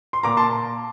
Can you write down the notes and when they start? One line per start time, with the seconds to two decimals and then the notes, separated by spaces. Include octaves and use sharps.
0.13 C6
0.23 A#2 A#5 D6
0.37 A5 C6